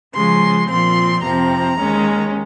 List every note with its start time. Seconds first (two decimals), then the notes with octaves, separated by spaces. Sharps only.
0.15 C#3 F3 G#3 C6
0.69 A#2 F3 C4 C6
1.23 F2 C3 F3 C4 A#5
1.77 D#2 D#3 G#3 C#4